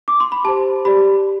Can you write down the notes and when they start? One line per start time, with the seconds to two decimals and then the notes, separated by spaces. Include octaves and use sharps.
0.08 D6
0.20 C6
0.32 B5
0.44 G4 C5 A5
0.85 G4 D5 B5